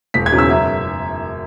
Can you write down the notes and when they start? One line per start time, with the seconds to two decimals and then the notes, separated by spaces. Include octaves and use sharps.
0.14 E1 B6
0.26 G#6
0.32 E2 C#3 F#3
0.38 E6
0.50 F#2 E5